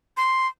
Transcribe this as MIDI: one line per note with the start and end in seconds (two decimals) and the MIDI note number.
0.17 0.47 84